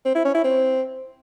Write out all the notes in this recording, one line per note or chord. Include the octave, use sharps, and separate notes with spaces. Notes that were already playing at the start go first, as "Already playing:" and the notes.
C4
E4
C#4
E4
C4